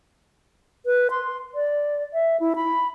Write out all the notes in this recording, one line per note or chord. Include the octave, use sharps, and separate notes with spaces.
B4
C6
D5
E5
E4
B5